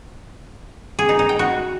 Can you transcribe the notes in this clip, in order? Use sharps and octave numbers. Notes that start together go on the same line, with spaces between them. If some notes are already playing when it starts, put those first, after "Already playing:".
G#4
D#4
D#4
G5
F#4